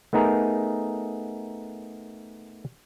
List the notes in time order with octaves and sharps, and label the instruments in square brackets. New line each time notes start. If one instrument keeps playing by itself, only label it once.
[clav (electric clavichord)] A3 B3 D#4 G#4 A#4